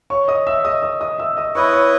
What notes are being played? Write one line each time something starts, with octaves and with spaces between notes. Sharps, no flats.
C#5 C#6
D#5 D#6
E5 E6
D#5 D#6
D#5 D#6
D#5 D#6
E5 E6
D#5 D#6
B3 E4 B4 C#5 D#5 C#6
C#5 C#6